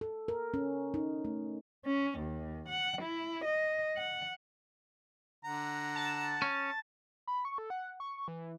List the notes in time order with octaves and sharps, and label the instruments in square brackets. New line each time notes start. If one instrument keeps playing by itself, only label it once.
[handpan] A4
A#4
C#4
D#4
A3
[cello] C#4
D#2
F#5
E4
D#5
F#5
[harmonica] D3 F#5 A#5
[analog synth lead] A5
[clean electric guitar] C#4
[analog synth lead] B5
C#6
A4
F#5
C#6
E3